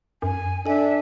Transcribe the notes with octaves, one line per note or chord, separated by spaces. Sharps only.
F#2 G#5
D4 A4 E5 G#5